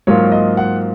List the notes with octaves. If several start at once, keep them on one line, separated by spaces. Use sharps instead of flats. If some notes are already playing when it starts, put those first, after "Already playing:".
G#2 F#3 A#3 F4 C#5
D#5
F#5